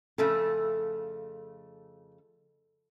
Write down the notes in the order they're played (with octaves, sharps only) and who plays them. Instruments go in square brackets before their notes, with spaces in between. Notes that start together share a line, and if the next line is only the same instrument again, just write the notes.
[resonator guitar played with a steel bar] F2 C#3 A3 [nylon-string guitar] A4